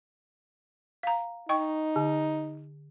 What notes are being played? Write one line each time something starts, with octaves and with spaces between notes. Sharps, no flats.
F5 A#5
D#4 D#5 G5 C#6
D3